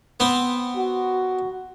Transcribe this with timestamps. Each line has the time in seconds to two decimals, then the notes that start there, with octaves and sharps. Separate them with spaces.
0.20 B3 C4
0.76 F#4